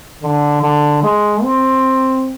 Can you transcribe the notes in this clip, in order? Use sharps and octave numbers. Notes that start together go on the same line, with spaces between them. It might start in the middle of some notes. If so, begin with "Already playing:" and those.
D3
D3
G#3
C4